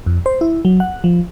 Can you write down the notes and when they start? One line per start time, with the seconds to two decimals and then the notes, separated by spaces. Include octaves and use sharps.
0.06 F2
0.26 C5
0.41 E4
0.65 F#3
0.80 F#5
1.04 F3